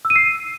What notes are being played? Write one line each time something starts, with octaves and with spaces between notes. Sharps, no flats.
E6
D#7
C7